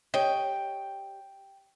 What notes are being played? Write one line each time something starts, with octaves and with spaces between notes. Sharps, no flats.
G4 C#5 D#5 G5